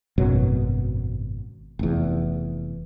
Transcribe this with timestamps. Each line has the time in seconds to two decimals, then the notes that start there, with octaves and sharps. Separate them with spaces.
0.18 G#1 F#2 B2 F#3
1.79 F1 E2